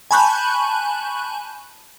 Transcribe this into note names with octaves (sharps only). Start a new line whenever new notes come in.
G#5 A5 B5 C#6 F#6 G6